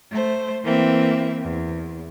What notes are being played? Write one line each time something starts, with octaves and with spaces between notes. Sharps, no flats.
A3 C5
E3 A#3 C4 E5
E2